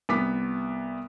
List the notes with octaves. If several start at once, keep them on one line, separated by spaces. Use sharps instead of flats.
C2 B3 D6 B6